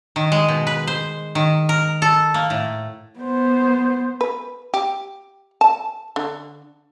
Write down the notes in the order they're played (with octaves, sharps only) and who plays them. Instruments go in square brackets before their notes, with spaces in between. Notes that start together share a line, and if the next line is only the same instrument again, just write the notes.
[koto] D#3
G#3
B2
B4
C5
D#3
A#4
A4
A#3
A2
[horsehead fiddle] B3 C5
[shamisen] B4
G4
A5
D3